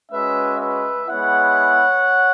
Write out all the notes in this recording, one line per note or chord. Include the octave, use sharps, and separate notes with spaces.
G#3 C#4 F#4 B4 E5
B4 E5
G#3 B3 E4 C#5 F#5